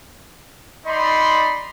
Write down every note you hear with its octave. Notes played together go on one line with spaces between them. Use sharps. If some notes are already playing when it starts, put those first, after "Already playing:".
D#4 D5 B5 C6